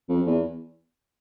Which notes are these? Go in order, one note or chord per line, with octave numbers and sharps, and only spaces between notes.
F2
E2